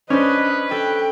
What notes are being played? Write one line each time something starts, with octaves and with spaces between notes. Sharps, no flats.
C#4 D4 B4 C5 D#5
A4 G5